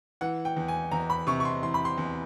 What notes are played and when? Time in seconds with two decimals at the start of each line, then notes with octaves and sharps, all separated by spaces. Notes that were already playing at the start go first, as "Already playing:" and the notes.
0.21 E3 F#5
0.45 G5
0.56 E2
0.68 G#5
0.91 E2 A#5
1.10 B5
1.27 C3 C#6
1.40 C#6
1.45 C6
1.63 E3 C6
1.74 B5
1.85 C6
1.97 E2